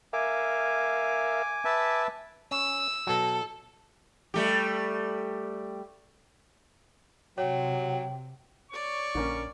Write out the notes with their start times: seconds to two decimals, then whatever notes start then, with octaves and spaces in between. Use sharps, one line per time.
0.13 A#4 E5 F5 G#5 D6
1.65 B4 E5 A5
2.51 C#4 E6
3.07 B2 F#3 A4
4.34 G3 A3 G4
7.38 C3 F#3 C#5 G5
8.71 C#5 D5 C#6
9.15 A#1 D3 A#3 C#4